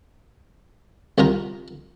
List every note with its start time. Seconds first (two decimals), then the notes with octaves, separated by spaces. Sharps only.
1.18 C2 D#3 F4 A#4